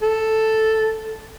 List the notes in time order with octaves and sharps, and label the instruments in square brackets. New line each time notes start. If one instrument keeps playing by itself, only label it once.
[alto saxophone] A4